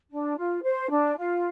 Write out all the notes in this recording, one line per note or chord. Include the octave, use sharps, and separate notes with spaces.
D4
F4
C5
D4
F4